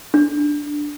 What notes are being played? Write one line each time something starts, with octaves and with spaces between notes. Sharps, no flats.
D4